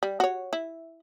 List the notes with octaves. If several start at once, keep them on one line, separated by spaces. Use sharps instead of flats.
G3
F#4 C#5
E4